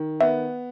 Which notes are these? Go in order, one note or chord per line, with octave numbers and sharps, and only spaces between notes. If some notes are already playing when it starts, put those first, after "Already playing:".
Already playing: D#3
B3 E5